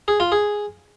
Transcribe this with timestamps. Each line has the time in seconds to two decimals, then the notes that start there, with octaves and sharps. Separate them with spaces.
0.08 G#4
0.20 F4
0.32 G#4